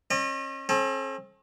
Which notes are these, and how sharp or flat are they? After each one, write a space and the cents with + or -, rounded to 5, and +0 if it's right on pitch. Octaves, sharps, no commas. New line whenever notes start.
C#4 -40 D#5 -40
C4 +45 A4 -35